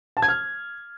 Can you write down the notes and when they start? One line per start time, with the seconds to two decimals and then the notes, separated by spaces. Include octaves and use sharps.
0.17 A5
0.22 G#6
0.28 F6